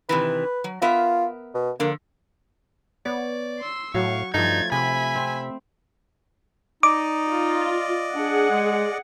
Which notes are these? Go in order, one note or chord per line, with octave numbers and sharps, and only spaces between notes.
C3 D#3 E3 B4
F#3
B3 F4 A#4 E5
B2
D3 F3 A#3
B3 C#5 D5
C6 E6
A2 F#3 F5 C#6
G2 F3 A3 D#4 G#6 A6
C3 E5 G#5 B5
C4
D#4 D5 D#5 D6
F4
D4 G#4 F#5
G#3